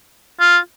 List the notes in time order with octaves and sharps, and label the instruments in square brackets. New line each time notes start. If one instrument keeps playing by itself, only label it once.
[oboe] F4